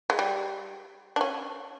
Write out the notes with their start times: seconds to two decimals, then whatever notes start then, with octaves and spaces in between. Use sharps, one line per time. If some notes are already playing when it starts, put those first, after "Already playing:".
0.10 G#3
0.19 G3
1.16 D4
1.21 C#4